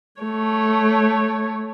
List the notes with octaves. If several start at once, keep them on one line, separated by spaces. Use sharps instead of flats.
A3 C#5